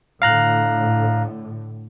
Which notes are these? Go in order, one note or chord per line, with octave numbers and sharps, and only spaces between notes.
A2 D3 F5 A#5 F#6